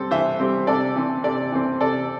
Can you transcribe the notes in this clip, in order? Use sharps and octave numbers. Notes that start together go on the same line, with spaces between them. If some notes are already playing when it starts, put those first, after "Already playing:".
Already playing: G3 C4 A4
E3 C5 E5
G3 C4
C3 A4 D5
E3 C4
C3 A4 D5
E3 C4
C3 A4 D5